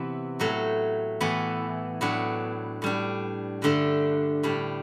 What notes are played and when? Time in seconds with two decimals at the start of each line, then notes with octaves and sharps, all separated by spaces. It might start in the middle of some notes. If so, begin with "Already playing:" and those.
Already playing: C3 E3 B3 E4
0.40 A2 F#3 A3
1.21 A2 E3 B3 E4
2.01 A2 F#3 B3 D4
2.82 A2 G3 D4
3.62 G2 D3 A3 D4
4.43 A2 G3 D4